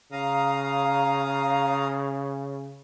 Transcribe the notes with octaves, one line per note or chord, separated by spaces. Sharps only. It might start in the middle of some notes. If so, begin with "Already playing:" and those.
C#3 F5 A#5 D#6